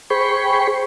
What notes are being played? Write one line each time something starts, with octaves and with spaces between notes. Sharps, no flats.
G#4 C5 G5 B5 C#6